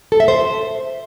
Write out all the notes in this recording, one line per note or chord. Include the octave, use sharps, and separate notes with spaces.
A4
E5
C5